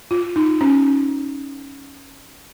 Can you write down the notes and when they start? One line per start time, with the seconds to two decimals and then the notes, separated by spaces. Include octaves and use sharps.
0.11 F4
0.36 D#4
0.61 C#4